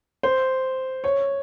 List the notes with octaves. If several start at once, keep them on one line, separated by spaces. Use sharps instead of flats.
C5
C#5